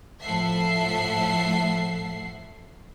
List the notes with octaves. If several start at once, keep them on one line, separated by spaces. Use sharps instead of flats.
A2 F3 A4 E5 F#5 C7